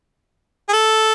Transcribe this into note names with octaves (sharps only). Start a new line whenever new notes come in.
G#4
A4